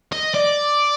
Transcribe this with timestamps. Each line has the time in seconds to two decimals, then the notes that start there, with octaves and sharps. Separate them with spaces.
0.12 D#5
0.35 D5